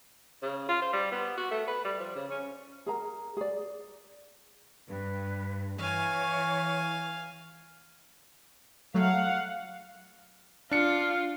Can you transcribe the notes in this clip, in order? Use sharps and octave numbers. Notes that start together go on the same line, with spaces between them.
C#3
F4
C5
G3
B3
F#4
A3
B4
G3
F3
C#3
C#4
G#4 A#4 A#5
G#4 D5
G2 B4
E3 C#5 F5 G#5 C#6
F#3 A3 F5 F#5
D4 F4 C#7